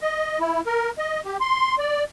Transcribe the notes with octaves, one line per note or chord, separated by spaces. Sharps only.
D#5
E4
A#4
D#5
G4
C6
D5